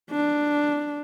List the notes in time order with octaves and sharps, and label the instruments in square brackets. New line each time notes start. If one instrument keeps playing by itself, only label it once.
[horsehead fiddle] D4